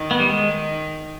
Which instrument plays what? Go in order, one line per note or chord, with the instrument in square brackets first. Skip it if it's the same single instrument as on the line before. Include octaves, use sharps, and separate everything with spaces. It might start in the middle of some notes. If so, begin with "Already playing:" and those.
Already playing: [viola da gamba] D#3
[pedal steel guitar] B3
G3
G#3